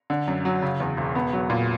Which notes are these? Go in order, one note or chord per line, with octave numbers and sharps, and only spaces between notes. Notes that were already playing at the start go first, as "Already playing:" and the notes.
D3
F#2
F#3
C#3
E2
E1
B3
F#3
A#2